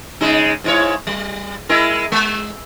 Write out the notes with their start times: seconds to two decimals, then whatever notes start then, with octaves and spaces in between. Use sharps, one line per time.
0.21 C#3 G#3 D#4
0.64 G#2 E4 C#5
1.07 G3
1.69 G#3 E4 A#4
2.12 G#3